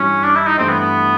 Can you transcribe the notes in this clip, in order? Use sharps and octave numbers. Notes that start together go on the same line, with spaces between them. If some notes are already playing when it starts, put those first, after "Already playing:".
Already playing: G2 E3 G3 C#4
D4
E4
D#4
G2 E3 A3 C4
B3
B3